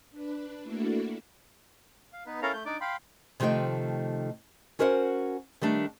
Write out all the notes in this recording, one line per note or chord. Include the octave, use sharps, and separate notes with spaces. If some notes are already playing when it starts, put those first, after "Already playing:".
D4 B4
A3 A#3 D4 E4 F#4 A4
F5
B3 D#4 B4
C#4 E4 A4 A#4 F5 A#5
A3 G6
D4 D#4 D5 D6
F5 G5 B5 C6
C3 D#3 F3 A3 D#5 G5
C#4 F#4 A#4 C5 D#5 F#5
D#3 G3 A3 D4